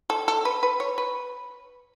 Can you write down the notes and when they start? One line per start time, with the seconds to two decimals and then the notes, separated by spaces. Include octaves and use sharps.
0.10 A4
0.28 A4
0.45 B4
0.63 B4
0.80 C#5
0.98 B4